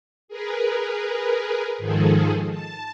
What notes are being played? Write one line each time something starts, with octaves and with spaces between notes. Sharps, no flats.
G#4 A#4 B4
G#2 D#3 F3 G#4 A4
A5